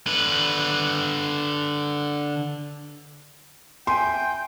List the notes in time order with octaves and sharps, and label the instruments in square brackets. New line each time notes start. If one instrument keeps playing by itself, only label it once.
[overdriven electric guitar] D3 B4
[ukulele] E5 G#5 [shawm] G5 [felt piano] C6